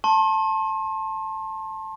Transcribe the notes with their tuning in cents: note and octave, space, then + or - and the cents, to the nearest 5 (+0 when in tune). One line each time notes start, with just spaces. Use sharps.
A5 +0 C6 +40